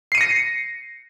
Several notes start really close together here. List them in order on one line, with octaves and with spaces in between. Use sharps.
C7 D#7 C#7 A#6